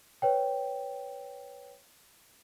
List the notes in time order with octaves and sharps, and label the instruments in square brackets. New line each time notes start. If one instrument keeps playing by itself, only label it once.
[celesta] B4 C#5 G5